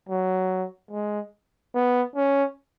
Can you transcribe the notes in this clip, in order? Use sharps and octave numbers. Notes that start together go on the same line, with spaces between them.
F#3
G#3
B3
C#4